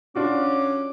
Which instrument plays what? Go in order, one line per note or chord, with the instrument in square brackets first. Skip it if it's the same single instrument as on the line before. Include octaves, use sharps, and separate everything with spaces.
[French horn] C#4 [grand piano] D4 F4 F#4 [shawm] D6